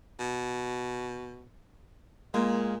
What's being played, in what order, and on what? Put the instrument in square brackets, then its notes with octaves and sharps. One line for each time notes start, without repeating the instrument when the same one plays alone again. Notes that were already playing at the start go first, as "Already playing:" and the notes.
[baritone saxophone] B2
[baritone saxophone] A#2 [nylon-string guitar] G#3 A#3